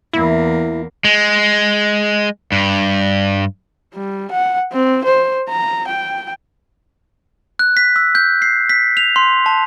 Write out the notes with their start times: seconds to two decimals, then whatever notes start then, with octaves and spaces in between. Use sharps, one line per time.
0.13 E2 A#3 E4
1.05 G#3
2.52 G2
3.94 G3
4.31 F#5
4.73 C4
5.05 C5
5.49 A#5
5.88 G5
7.59 F#6
7.77 B6
7.96 E6
8.15 G6
8.42 C7
8.69 B6
8.97 F7
9.16 C6
9.46 A5